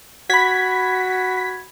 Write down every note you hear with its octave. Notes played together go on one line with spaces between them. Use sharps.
F#4 B5 G#6 B6